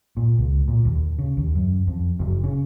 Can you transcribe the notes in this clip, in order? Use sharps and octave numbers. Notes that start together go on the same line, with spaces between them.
A#2
C#2
A#2
D#2
C#3
D#2
F#2
F2
F#1
C#3